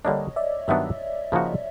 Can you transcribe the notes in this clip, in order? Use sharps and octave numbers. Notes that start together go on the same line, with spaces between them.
D3 G3 A#3 D4 C#5 D#5
D5 E5
G2 D#3 F#3 B3 D4 D5 E5
C#3 F3 A#3 D#4 F#4